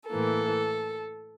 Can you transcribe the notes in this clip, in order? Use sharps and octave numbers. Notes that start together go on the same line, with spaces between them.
A2 E3 A#3 A4